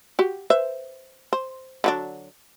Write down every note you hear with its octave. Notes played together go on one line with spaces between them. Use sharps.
F#4 G4
B4 C5 E5
C5
D3 F#3 D4